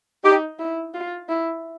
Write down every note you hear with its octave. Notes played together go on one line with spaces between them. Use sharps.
D#4 G4
E4
F4
E4